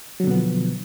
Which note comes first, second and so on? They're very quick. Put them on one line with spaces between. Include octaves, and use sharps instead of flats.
F#3 D3 B2 B3 F3